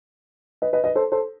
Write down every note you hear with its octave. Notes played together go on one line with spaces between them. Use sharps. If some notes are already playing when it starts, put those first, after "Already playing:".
B4 D#5
B4 D#5
B4 D#5
A4 C5
A4 C5